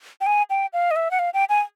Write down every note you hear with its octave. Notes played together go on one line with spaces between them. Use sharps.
G5
G#5
G5
F5
D#5
E5
F#5
F5
G5
G#5